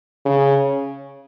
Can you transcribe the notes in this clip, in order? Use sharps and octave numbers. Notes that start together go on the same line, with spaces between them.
C#3